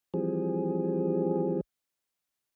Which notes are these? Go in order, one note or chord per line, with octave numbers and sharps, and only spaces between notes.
E3 F3 G3 C4 G#4